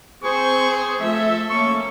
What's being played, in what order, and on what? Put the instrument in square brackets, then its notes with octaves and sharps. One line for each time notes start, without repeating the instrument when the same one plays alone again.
[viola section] C4 C5 [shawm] G#4 [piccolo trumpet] C#6
[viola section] F3 A3 E5 [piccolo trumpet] A4
[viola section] A#3 C#4 [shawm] C#6